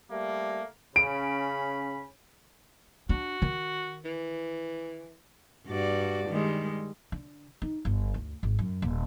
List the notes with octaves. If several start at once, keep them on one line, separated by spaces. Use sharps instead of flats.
G3 A3 A#3
C#3 C#4 B5 D7
D4 F#4
D#3
E3
G2 F#4 D5
D#3 G3 G#3
D3
D#4
G1
D2
G#1
F#2
D#1